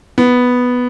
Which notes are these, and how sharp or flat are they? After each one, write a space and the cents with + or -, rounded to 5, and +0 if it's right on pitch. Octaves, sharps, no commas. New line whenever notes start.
B3 +0